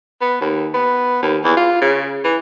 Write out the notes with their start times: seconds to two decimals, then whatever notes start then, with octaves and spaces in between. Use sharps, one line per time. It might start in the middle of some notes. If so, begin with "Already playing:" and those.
0.21 B3
0.41 D#2
0.74 B3
1.22 D#2
1.44 E2
1.57 F4
1.81 C#3
2.24 E3